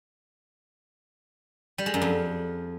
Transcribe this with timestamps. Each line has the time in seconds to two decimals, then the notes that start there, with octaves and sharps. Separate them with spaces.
1.78 G3
1.86 G#3
1.94 F#2
2.02 F2